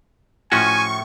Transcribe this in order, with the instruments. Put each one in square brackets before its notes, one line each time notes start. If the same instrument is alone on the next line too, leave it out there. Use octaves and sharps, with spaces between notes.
[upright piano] A2 [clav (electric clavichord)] F3 C#4 F#4 [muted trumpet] G#5 [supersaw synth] C#6